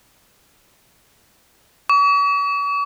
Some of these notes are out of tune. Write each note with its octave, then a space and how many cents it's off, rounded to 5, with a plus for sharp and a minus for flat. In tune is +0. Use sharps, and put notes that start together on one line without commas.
C#6 +45